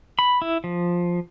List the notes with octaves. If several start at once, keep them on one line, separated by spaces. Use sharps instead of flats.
B5
E4
F3